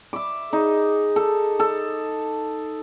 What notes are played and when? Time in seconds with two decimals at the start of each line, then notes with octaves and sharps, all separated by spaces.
0.13 E5 D6
0.53 D#4 G#4
1.16 A4
1.60 A4